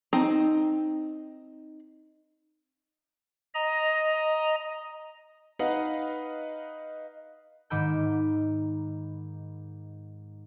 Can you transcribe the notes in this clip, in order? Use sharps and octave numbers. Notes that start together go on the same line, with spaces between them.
C4 D#4 A#5
D#5 A#5
D#4 B4 D#5 F5 F#5
G#2 D#3 B5 D6 E6 G6